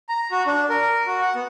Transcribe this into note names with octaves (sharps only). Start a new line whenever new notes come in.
A#5
F#4
D4
A#4
F#4
F#5
B3